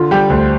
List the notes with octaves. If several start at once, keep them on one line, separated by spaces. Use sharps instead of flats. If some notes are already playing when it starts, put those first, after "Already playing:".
Already playing: D3 F4
G3 G4
D2 C5